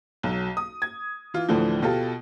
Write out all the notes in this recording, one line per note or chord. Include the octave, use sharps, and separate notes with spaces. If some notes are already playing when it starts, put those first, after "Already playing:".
B1 F#3
D#6
G#6
E3 F4
D2 A2 D3 E3 F3
B2 F4 G4 A4